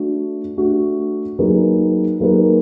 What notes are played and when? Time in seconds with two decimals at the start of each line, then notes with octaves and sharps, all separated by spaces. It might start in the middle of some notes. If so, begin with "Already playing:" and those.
Already playing: A3 D4 F#4
0.57 A3 D4 F#4
1.39 F#3 A#3 D#4 G#4 B4
2.20 F#3 A#3 D#4 G#4 B4